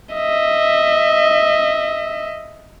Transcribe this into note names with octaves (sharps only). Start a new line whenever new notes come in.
D#5 E5